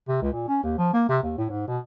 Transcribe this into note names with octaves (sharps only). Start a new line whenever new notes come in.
C3
C#2
A#2
C#4
D#2
F3
A#3
C3
D#2
A2
G#2
B2